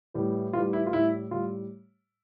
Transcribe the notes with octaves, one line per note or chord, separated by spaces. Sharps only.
A2 E3 G3
A2 E3 G3 F4
E4
F4
A2 G3 E4
A2 G3 F4